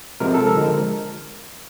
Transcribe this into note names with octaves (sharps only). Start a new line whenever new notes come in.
C3 F3 G#3 A#4
A4
A#4
D3 F3 G#3